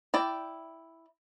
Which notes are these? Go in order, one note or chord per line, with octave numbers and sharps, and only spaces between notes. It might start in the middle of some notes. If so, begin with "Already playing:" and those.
E4 D5 G5